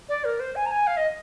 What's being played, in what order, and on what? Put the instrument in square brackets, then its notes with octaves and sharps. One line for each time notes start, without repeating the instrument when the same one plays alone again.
[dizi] D5
A#4
C5
G#5
A#5
G#5
F5
D#5